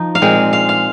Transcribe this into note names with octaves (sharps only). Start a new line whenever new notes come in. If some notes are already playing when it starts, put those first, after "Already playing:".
Already playing: F3 D#4
F5
A#2 G#3 C4
F5
F5